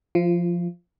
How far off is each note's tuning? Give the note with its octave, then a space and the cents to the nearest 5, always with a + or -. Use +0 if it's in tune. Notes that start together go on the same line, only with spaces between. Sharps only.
F3 +0 F4 -30